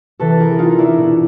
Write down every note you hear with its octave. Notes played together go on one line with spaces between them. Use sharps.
C3 E3 A4 B4
G#4 A#4
D#4 F4
D4 E4
B2